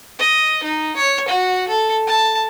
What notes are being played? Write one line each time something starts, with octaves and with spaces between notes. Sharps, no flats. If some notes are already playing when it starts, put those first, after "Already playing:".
D#5
D#4
C#5
F#4
A4
A5